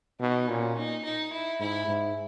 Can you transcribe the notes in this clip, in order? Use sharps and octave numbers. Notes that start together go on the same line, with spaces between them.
B2 D#4
A#2 C#4
D#4
D#4
E4
G#2 E4
G#2